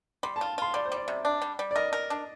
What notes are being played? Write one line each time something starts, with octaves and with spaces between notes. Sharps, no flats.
G3 C6
A5
F4
F4 C6
G3 D5
C5
G3 D5
C3
D4
G3
G3
D5
A#4 D#5
A#4
D4